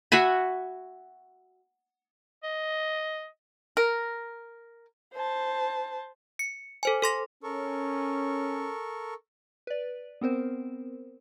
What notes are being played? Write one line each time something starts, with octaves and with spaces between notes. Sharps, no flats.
F#4 E5 G#5 B5
D#5
A#4
C5 A5
C#7
A4 C5 G#5
A4 C6 A#6
C#4 A4 A#4 C#6
B4 D5
B3 C4 A#4 C5